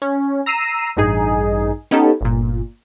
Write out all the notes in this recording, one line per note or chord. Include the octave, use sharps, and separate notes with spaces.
C#4
A#5 E6 C7 D#7
A1 G2 D#4 G#4
B3 C#4 D#4 G4 A4
G1 A#2